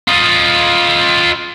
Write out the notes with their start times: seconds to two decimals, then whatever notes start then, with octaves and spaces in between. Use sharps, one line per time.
0.08 F4 D#5